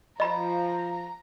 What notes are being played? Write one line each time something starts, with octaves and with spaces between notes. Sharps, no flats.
F3 D#5 A#5 B5